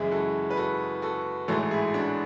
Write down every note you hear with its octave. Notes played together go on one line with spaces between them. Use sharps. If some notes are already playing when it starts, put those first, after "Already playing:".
Already playing: F#2 C#3 E3 G#3 E4 G#4
F#4 A4
B4
F#4 A4
F#4 A4
A1 G#2 E3 A3 F#4 A4
E4 G#4
D4 F#4